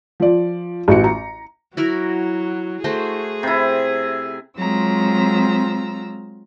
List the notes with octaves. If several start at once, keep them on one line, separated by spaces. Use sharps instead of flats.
F3 D5
A1 F#4 C#7
A#5
F#3 E4 F#4 A#4
A3 F#4 G#4 C5
C3 E4
F#3 G#3 C4 F4 A#5 E6